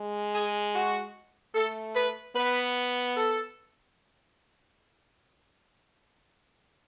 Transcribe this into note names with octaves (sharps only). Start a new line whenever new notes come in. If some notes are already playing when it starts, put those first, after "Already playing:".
Already playing: G#3
G#4
F#4
A3 A4
B4
B3 B4
A4